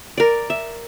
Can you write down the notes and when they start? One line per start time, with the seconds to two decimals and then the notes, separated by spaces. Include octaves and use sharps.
0.18 A#4 D5
0.50 E5